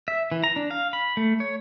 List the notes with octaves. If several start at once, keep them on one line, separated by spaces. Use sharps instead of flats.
E5
E3
A#5
D4
F5
B5
A3
C#5